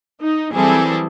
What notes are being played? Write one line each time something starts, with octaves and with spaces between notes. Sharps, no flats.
D#4
E3 F#3 G3 C4 G#4 A4